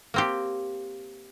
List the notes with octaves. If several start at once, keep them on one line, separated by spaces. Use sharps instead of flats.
A#3 C4 G4